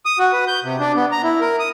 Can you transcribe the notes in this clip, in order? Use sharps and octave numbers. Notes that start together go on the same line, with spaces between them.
D#6
F#4
B4
G6
C3
D4
B3
A#5
E4
A#4
D#6